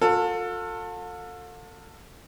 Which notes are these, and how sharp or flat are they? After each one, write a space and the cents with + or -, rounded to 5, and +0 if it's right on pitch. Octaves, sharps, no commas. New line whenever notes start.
F4 +45 A4 +25